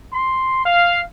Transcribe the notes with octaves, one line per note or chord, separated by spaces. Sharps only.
C6
F5